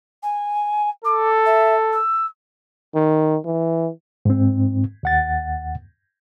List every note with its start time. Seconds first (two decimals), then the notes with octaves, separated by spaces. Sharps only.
0.22 G#5
1.04 A4 D6
1.45 E5
1.92 E6
2.95 D#3
3.45 E3
4.25 G#2 C4
5.03 D#2 F#5 A6